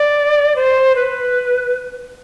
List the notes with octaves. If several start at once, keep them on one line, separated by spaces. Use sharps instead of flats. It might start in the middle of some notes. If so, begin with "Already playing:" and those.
Already playing: D5
C5
B4